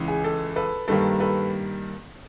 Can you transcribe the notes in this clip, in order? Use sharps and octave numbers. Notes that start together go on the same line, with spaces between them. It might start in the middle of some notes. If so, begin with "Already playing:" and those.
Already playing: C#2 C#3 E3
G#4
A4
A4 B4
G2 D#3 G3 A#3 A4 B4
A4 B4